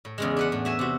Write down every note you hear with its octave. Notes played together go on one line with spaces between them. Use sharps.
A2
E2 C#3 G#3
D4 B4 F#5
A2
F#4 E5 G#5
C3 F#4